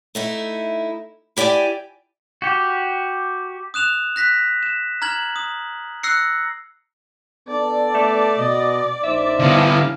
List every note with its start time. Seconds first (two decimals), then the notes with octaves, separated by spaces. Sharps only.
0.15 A3 D#4 E4
1.37 E4 G4 D5 G5 G#5
2.42 F#4 G4
3.74 D#6 F#6 E7 F7
4.16 F#6 A#6 B6
4.63 E7
5.02 A#5 F6 G#6 F#7
5.36 D#6
6.03 E6 F#6 A#6 C7 C#7
7.48 B3 D4 A4 D5
7.94 A3
8.39 B2 D#5
9.04 A#1 D#4 C5 E5
9.39 D3 B3 E4 F5